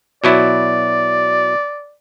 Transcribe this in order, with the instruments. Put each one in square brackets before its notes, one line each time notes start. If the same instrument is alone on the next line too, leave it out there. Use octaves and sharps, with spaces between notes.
[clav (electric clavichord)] B2 F#3 E4 [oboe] D5